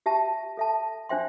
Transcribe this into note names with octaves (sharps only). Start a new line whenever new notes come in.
G4 E5 A5
A4 E5 A5
D4 C5 E5 G5 C6